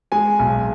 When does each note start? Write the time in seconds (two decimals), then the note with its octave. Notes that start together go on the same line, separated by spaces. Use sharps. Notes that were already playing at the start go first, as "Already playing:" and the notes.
0.12 G#3 G#5
0.39 B1